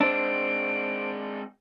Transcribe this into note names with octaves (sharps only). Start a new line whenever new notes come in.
G#3 C4 D4 C5 E6 D7